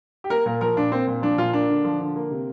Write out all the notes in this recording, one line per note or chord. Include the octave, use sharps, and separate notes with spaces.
G4
A#3 A#4
A#2 A#4
F3 A#4
A#2 D4
A#3 C4
A#2
F3 D4
A#2 F4
A#3 D4
D3
F3
D3
A#3
C3